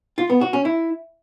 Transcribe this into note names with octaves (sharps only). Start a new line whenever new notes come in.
F4
B3
F#4
C#4
E4